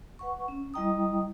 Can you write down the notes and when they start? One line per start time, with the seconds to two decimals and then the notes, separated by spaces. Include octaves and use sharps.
0.19 B4 F#5 C#6
0.48 C#4
0.74 G3 E4 D#5 G5 A#5 D#6